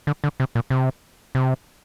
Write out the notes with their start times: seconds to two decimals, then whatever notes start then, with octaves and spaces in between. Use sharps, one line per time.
0.07 D3
0.24 D3
0.40 C3
0.55 A#2
0.70 C3
1.35 C3